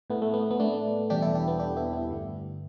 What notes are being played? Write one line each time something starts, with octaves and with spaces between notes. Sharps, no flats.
A2 A3 B3
A3
B3
B3
A3 D4
E2 B2 G3 D4 G4
E4 A4
D4 G4
B3
D4 G4
B3 E4
B3 E4
G2 D3 A3